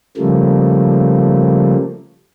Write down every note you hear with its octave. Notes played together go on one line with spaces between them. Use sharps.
C#3 F3 G3 A3 A#3